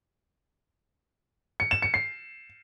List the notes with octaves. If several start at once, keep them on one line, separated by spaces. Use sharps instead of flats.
C#7
E7
C#7
C7